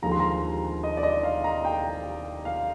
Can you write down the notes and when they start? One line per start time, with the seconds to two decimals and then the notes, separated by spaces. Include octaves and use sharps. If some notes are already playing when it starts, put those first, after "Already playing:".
0.02 D#2 D3 F3 G#3 A#5
0.12 C6
0.20 A#5
0.84 D#5
0.97 D5
1.03 D#5
1.23 F5
1.44 A#5
1.65 G5
2.45 F5